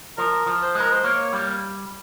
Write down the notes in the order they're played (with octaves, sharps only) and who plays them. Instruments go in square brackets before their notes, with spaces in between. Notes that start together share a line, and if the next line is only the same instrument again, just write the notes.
[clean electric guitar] F3 [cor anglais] A#4
[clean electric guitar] F3
[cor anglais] C5
[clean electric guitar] G#3
[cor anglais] A#4
C5
[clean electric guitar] A#3 [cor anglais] C#5
[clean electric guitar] G3